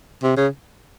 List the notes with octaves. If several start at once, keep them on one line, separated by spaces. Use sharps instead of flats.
C3
C#3